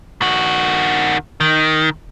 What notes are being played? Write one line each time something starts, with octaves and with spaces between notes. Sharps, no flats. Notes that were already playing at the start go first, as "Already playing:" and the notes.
D#3 F#4
D#3